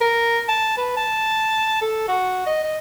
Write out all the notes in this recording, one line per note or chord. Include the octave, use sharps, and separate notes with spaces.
A#4
A5
B4
A5
A4
F#4
D#5
D#5